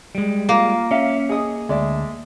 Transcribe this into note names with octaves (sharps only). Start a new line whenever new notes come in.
G3 G#3
A#3 F4
C#4 E5 F5
G#4 D#5 D#6
D2 G#3 D5 E5